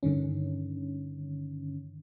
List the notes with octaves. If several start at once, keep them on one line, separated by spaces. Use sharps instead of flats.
G2 D3 D#3 C#4